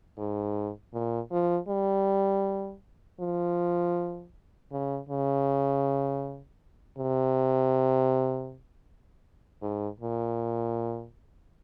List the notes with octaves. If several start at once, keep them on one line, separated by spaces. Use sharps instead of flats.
G#2
A#2
F3
G3
F3
C#3
C#3
C3
G#2
A#2